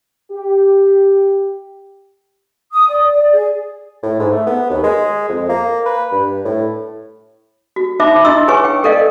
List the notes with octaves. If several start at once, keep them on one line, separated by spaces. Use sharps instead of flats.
G4
D#6
D5
D5
G#4
A2
G#2
A3
B3
D#2
G#3
F2
A#3
B4
G2
A2
F#4
D#4 C5 E5 B5 D6
D4 E4 D#5 C6 E6
G#4 B4 C#5 G#5 C#6
G5
A4 A#4 D5 D#5 F5